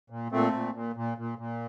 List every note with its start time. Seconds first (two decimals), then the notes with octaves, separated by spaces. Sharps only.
0.10 A#2
0.32 A#2 A3 C4
0.53 A#2
0.74 A#2
0.96 A#2
1.18 A#2
1.38 A#2